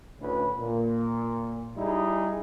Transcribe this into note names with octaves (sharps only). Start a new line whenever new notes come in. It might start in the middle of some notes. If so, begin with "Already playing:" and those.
D2 A2 C#4 B4
A#2
G3 D#4 E4 G#4